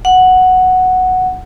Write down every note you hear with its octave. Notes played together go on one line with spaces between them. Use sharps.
F#5